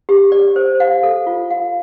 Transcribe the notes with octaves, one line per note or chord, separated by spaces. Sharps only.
G4
D5
C5
F5
A4
F4
F5